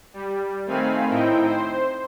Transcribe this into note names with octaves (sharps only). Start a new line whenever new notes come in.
G3
D#3 A3 C4 F5 G#5 B5
A2 C4 D#4 E4 G5
C5